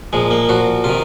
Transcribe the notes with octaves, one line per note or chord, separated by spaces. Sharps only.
A#2 F3 G#3
A#3
A#2 F3 F#4
C3 D#3 F4